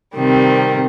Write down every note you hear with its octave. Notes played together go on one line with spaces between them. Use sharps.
C3 D#3 G3 C4